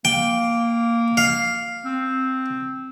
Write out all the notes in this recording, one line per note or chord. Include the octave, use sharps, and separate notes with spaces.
A#3 G5
F5
C4